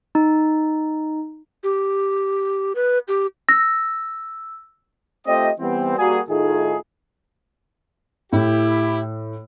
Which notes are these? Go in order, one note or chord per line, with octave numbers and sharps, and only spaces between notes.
D#4
G4
B4
G4
E6 A#6
A3 C4 F4 G4 D#5
E3 G3 B3 C4
G3 A#3 F#4 G#4
A2 D#3 A3 D#4 F4 G#4
A2 E4 G4